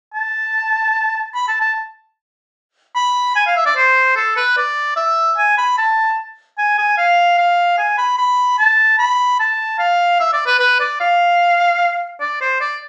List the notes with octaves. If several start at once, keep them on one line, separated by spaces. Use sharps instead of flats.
A5
B5
A5
A5
B5
G#5
F5
E5
D5
C5
A4
B4
D5
E5
G#5
B5
A5
G#5
G#5
F5
F5
G#5
B5
B5
A5
B5
A5
F5
E5
D5
B4
B4
D5
F5
D5
C5
D5